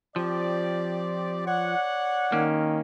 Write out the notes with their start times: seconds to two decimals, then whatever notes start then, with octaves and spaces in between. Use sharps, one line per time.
0.16 F3 C4 G4 D5
1.47 C#5 D5 F#5
2.32 D#3 A#3 C#4